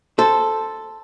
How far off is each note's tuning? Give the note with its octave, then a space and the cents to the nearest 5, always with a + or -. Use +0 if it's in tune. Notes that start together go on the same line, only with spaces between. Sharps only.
A4 +0 C5 -5